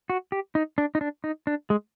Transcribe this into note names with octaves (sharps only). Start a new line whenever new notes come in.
F#4
G4
D#4
D4
D#4
D4
D#4
D4
G#3